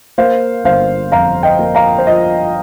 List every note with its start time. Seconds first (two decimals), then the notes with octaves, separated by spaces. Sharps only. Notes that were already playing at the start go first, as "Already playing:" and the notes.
0.18 A#3 C5 F5
0.64 G1 C5 F5
1.12 F2 F5 A#5
1.43 D#5 G5
1.59 A#3
1.75 F5 A#5
1.98 C5
2.06 F3 D#5